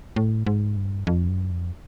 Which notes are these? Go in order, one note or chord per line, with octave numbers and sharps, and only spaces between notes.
A2
G#2
G2
F2
F#2
F2